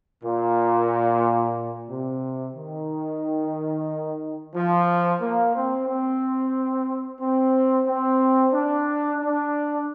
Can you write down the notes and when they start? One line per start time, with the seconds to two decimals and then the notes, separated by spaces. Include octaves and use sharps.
0.24 A#2
1.89 C3
2.56 D#3
4.55 F3
5.21 A#3
5.55 C4
5.88 C4
7.21 C4
7.86 C4
8.54 D4
9.19 D4